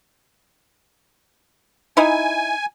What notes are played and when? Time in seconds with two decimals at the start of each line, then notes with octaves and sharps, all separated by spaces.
1.97 D#4 E4 G#5